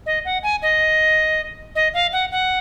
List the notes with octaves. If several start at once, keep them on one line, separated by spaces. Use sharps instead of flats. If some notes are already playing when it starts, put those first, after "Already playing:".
D#5
F#5
G#5
D#5
D#5
F5
F#5
F#5